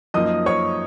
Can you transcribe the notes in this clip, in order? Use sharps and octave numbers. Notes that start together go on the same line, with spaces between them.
F#2 F3 A#3 D#4 D#5 D#6
C#5 C#6